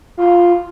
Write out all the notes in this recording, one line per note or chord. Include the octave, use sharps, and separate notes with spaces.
F4